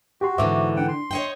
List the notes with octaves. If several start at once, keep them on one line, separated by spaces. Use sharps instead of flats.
F#4 G4 C6
G#2 D3 E3 C5 E5 D6
D4 F#5 G5
C6
C#5 D#5 G5